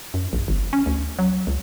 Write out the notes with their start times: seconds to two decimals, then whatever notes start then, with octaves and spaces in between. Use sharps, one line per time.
0.14 F#2
0.33 A#1
0.48 G1
0.73 C#4
0.86 D2
1.19 F#3
1.47 C#2